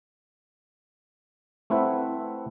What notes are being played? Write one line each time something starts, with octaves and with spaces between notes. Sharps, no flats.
A3 C4 E4 B4 E5 F#5